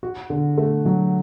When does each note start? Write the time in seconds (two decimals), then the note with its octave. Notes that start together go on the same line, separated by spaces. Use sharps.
0.03 F#4
0.30 D3
0.58 A3
0.85 F#3